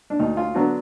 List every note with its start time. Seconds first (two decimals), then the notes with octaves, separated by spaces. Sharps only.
0.10 D4
0.19 D2 D#4
0.37 F4
0.55 D3 F#3 B3 D4 F#4